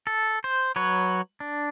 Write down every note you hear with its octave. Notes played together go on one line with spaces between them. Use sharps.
A4
C5
F#3 B4 C#5
D4